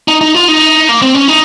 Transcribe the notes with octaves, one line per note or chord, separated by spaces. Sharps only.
D#4
D#4
F4
D#4
A#3
C4
C#4
D#4